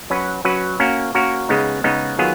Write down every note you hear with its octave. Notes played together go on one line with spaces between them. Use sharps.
F#3 C#4 F#4 B4
F#3 C#4 F#4 B4
A#3 C#4 F#4 A#4
A#3 C#4 F#4 A#4
C#3 G#3 B3 D#4
C#3 G#3 B3 D#4
D#3 F#3 B3 F4 G#4